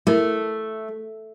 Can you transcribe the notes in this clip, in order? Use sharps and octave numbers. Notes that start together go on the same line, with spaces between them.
A3 E4 A#4